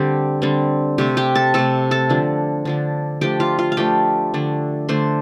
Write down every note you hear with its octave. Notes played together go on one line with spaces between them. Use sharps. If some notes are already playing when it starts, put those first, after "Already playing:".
Already playing: D3 G3 C4 G4
D3 G3 C4
C3 A3 C4 G4
G4 G5
A4 A5
C3 A3 C4 A4 A5
A4 A5
D3 F3 D4
D3 F3 D4
F3 A3 D4 G4 G5
F4 F5
F4 F5
F5
F3 A3 D4 G4 G5
D3 A3 D4
D3 A3 D4 C5 C6